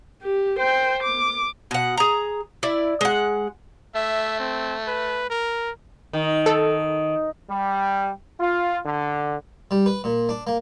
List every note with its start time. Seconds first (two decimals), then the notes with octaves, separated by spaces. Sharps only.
0.23 G4
0.59 C5 G5
1.03 D6
1.71 B2 F#5
1.97 G#4 A#5
2.63 E4 D5
3.01 G#3 F#5
3.95 A3 E5
4.40 C4
4.87 B4
5.30 A#4
6.13 D#3
6.46 A4
7.50 G3
8.40 F4
8.86 D3
9.71 G3
9.86 B4
10.04 A#2
10.29 D4
10.47 A#3